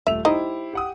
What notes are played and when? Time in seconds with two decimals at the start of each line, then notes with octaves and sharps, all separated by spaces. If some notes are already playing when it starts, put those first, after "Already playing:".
0.07 D#1 A3 E5 F7
0.25 D#4 E4 G4 C5 D#5
0.73 G4 F#5 D#6